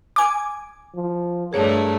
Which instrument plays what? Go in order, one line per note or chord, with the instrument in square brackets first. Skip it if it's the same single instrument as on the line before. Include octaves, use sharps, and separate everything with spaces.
[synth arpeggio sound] G#5 D6
[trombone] F3
[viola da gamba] G2 A3 [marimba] G#4 C#5 [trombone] A#4